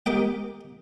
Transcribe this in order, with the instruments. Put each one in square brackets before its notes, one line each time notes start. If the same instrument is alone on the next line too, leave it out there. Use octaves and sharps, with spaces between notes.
[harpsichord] G4 A#4 D#5 G5